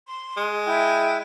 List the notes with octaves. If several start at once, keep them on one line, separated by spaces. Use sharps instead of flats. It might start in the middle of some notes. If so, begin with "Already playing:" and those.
C6
G#3
E4 G5 G6